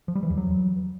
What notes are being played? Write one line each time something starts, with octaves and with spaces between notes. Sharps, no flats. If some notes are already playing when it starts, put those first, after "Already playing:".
F3
G3
E3
E2
F#3